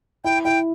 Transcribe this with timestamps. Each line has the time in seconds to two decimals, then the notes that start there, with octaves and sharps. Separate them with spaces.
0.24 E4 G5
0.44 E4 G5